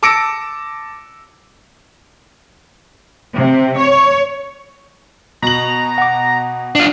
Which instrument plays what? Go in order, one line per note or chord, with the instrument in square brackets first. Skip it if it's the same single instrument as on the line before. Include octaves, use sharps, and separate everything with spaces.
[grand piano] A5 D6 E6 A#6 C#7 D7
[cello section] C3
C#5
[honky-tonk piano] B2 F#7 [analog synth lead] A#5
[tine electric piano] F#5 D6
[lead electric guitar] D4 F4